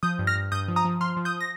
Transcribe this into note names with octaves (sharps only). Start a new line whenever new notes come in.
F3 D#6 G6
G2
F6 A#6
G2
G2 D#6 G6
F3
A#5 D#6
F3
F3 C6 F6
F3
D#6 G6
A#6